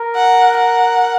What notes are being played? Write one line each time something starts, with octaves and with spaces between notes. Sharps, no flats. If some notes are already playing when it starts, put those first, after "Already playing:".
Already playing: A#4
F#5
F#5